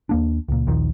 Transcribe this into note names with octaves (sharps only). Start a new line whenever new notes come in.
D#2 A#3 D4
C#2 A#2
A#1 D#2 D#3 F3